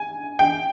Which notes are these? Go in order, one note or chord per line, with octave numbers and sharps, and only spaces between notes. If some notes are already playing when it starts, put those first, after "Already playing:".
Already playing: G#5
G5